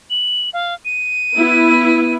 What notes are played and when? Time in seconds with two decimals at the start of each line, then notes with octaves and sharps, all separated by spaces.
0.10 F#7
0.53 F5
0.85 D#7
1.36 B3 E4